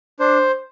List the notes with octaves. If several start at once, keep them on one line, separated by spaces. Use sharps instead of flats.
D4 C5